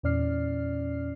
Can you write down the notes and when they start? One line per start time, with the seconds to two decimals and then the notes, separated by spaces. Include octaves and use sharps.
0.03 E2 A#2 C#4 D5 F6 C7